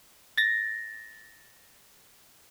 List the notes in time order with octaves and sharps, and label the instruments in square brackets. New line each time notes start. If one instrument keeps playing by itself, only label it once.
[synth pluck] A6 A#6